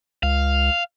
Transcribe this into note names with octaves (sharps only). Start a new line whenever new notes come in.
C#2 F5